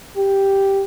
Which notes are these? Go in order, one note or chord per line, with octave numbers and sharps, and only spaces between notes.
G4